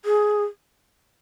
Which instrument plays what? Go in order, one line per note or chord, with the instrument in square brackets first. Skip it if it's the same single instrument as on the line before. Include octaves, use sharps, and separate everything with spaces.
[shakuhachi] G#4